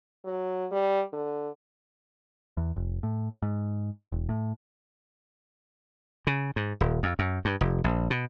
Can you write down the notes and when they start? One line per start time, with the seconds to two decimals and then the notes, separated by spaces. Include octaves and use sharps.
0.25 F#3
0.71 G3
1.13 D3
2.57 E2
2.76 F1
3.03 A2
3.42 G#2
4.12 E1
4.29 A2
6.27 C#3
6.56 G#2
6.81 D#1
7.03 F2
7.19 F#2
7.45 G2
7.61 F1
7.84 A#1
8.10 B2